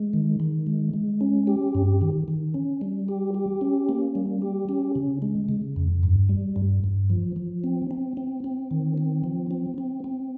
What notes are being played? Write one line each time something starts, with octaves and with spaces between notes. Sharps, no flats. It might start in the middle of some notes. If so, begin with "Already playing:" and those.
Already playing: G#3
D#3
D#3
G#3
G#3
C#4
G4
G2
D#3
D#3
C#4
G3
G4
G4
C#4
A#3
G3
G4
C#4
C#3
G#3
C#3
F2
G2
G3
G2
G2
F3
F3
C4
C4
C4
C4
D#3
C4
F3
C4
C4
C4